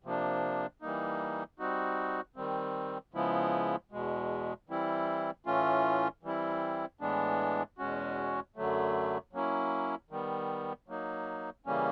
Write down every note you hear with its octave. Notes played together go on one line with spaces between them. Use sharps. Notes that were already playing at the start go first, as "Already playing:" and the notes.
C3 F3 A#3 D4
E3 G3 A#3 D#4
G3 C4 D#4 F#4
D#3 G3 C4
C#3 F3 G#3 B3 E4
E2 B2 G#3
E3 G3 C4 E4
A2 E3 A3 C#4 F4
E3 G3 C4 E4
A2 E3 G#3 B3 D4
E2 B2 G#3 C#4 F#4
F#2 D3 F#3 A3
F#3 A#3 C#4 E4
D#3 G3 B3
F#3 A#3 D#4
C#3 E3 G3 A#3 C#4